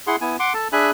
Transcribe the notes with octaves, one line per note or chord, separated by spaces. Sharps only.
E4 G#4 F#5 C6
B3 E4 G#5
F#5 C6 D6
A4 A5
D4 G#4 E5 G#5 B5 F#6